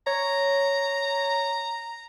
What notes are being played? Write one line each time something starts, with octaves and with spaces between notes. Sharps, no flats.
C#5 A#5